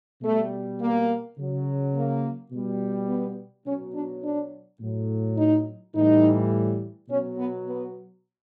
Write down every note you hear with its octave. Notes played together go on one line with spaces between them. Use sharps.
B2 G3 A3
A#3
C#3 F#3
A#3
B2 G3
B3
B2 F#3 C#4
D4
D4
A2 F#3
D#4
A2 E3 G3 D#4
B2 F#3 C#4
B3
B3